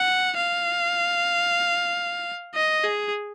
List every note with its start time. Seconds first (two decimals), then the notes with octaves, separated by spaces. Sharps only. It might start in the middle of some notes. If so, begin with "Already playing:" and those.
Already playing: F#5
0.37 F5
2.55 D#5
2.84 G#4